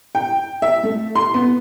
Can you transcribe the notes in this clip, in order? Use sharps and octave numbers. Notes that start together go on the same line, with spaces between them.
G5
E5
A3
C6
B3